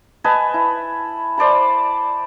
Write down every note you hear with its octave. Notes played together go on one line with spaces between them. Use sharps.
B4 D#5 G#5 A5
E4
C5 D5 A5 B5